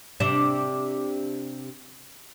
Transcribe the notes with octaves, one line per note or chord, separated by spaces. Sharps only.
C3 D4